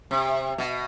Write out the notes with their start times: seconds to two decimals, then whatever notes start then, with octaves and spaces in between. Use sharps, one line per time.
0.11 C3
0.58 B2